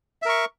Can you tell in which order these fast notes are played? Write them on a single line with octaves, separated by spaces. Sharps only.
E5 A#4 C#6